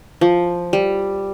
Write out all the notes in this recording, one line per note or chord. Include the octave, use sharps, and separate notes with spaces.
F3
G3